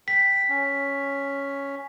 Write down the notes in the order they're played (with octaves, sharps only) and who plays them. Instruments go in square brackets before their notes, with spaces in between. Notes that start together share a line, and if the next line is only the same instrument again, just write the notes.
[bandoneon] G5 [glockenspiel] B6
[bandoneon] C#4